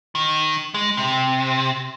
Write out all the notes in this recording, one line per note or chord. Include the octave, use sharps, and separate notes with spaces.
D#3
G#3
C3